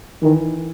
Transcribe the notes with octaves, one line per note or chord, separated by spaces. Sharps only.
D#3 E3